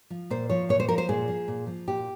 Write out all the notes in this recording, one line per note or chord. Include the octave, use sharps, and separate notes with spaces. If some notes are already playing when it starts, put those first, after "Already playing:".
F3
A#2 C5
F3 C#5
A#2 C#5
C5
F3 A#4
C5
A#2 G#4
F3
A#2
F3
A#2 G4